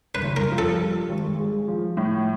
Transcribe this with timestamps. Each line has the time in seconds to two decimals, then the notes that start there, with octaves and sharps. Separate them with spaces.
0.15 B4
0.22 F#1
0.37 A#4
0.52 F3
0.58 A4
0.80 G2
1.09 G#1
1.38 G#3
1.68 F3
1.97 A2